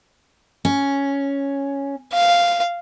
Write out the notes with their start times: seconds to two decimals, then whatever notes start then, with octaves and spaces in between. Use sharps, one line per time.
0.65 C#4
2.14 F5